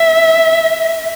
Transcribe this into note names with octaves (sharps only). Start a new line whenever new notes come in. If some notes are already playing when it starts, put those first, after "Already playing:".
Already playing: E5